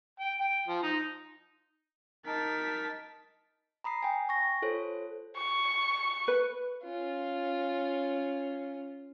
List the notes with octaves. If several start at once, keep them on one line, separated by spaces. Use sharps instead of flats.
G5
G5
F3
D#4
D#4 A#4 A5 B6
A#5 B5 D#6 C7
G5 G#5
C#6 A#6
F4 A4 C5 C#5
C#6
B4
C#4 F4